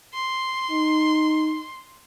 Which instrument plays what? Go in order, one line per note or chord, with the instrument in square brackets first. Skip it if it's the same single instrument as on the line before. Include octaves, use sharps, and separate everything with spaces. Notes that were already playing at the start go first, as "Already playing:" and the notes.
[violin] C6
[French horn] D#4